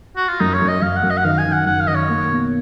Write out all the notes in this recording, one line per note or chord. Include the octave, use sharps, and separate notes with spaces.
F#4
F4
F#2 D#4
C#5
F#2
D#5
F#2 F5
F#5
F#2
D#5
F#5
D#3 F5
G#5
D#3
F#5
F#2 F#5
F5
D#3 D#5
C#5
A#3
B2